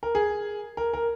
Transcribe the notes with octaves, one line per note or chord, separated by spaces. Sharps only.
A#4
G#4
A#4
A#4